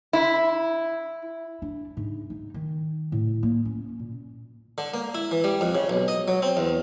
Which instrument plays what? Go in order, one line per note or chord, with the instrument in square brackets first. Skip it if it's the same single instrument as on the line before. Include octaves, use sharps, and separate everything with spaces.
[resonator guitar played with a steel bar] E4
[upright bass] D4
G#2
D#4
D#3
A2
A#3
C#4
A#2
[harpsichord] D3
A#3
E4
E3
G3
F2
C#3
B1
D#5
F#3
C4
E2